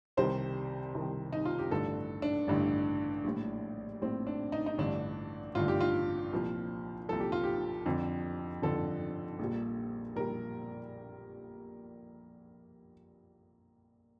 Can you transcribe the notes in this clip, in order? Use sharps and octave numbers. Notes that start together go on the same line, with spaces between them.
C2 C3 D#3 G3 C5
C2 C3 D#3 G3
D#4
F4
G4
A1 G2 D3 A4
D4
A1 G2 D3
A#1 A2 G3
A#1 A2 G3 C4
D4
D#4
D#4
A1 G2 D3 D4
A1 G2 D3 F4
G4
F4
C2 A#2 F3
C2 A#2 F3 A4
G4
F4
G4
F2 D3 F3
F2 D3 F3 A4
A#1 A#2 G3
A#1 A#2 G3 A#4